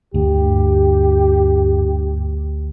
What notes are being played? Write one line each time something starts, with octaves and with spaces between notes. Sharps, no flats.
D2 G2 G4